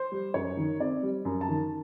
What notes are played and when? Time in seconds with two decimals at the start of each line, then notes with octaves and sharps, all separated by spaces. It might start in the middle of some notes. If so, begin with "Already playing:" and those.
Already playing: C5
0.12 G3
0.34 F#2 C#5
0.57 D#3
0.80 C4 D5
1.03 G3
1.25 F#2
1.41 A5
1.48 D#3